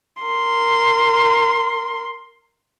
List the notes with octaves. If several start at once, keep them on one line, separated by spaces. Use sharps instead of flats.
A#4 C6